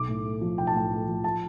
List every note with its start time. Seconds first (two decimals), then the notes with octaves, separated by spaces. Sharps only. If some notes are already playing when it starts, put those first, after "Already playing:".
Already playing: B1 D6
0.08 A2
0.25 A3
0.41 F3
0.58 B1 G5
0.67 A5
0.74 A2 G5
0.91 A3
1.08 F3
1.24 A5